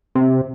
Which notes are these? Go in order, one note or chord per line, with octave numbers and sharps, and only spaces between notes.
C3